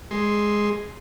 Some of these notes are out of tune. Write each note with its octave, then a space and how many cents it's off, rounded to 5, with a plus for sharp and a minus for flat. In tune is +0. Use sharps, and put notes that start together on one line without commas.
G#3 +0 C6 +0